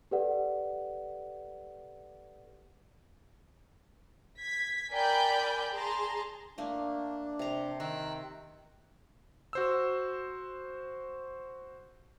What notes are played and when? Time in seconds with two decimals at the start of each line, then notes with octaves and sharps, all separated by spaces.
0.11 G4 A4 B4 D5 F#5
4.39 G#6 B6
4.91 A#4 D5 G5 G#5 B5 G6
5.72 G#4 A5 A#5 C6
6.58 A3 A#3 D4
7.39 C3 A#5
7.80 D#3 A#5 E6 F#6
9.53 F#4 C5 E6